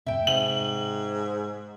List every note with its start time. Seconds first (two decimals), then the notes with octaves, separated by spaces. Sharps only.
0.07 F2 A2 C3 E5 G5
0.27 G#2 C3 F#7